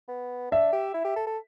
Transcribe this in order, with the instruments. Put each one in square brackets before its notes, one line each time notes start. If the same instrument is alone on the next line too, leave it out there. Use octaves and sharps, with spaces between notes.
[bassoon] B3
[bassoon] D4 [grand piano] E5
[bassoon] G4
E4
G4
A4
A4